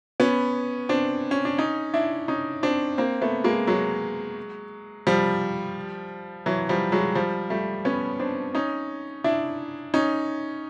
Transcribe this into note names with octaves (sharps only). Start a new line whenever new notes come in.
B3 C#4
C4 D4
C#4
D4
C#4 D#4
D4 E4
C#4 D#4
C4 D4
A#3 C4
A3 B3
G#3 A#3
F#3 G#3
F3 G3
E3 F#3
F3 G3
F#3 G#3
F3 G3
G3 A3
B3 C#4
C4 D4
C#4 D#4
D4 E4
C#4 D#4